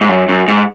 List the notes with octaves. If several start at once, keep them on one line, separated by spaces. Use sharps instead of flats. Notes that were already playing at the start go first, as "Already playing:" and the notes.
G#2
F#2
F#2
G#2